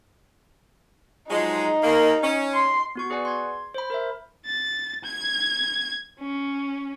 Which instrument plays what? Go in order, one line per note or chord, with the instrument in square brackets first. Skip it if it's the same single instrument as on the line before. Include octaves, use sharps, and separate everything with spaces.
[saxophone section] F3 F#3 G#3 [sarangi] D#4
[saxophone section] D#2 A#3
C#4
[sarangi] C6
[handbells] B3 F#4 C#6
G#4 B4 D5 F#5 G#5
C6 G#6
C5 B5
A#4 C5 E5
[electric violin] A6
G#6
C#4